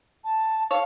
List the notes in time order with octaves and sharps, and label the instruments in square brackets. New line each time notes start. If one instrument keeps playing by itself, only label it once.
[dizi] A5
[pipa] A4 C#5 [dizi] F5